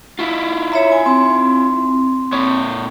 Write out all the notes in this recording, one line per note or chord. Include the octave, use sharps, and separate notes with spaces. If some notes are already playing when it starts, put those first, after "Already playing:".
E4 F4
C#5 E5 A#5
G#5
C4
A#2 C#5